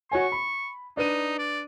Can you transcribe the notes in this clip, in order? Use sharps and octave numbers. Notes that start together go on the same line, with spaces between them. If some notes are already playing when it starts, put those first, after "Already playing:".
F#4 C#5 G#5 C#6
B5
D4 D#4 B4 D#7
D5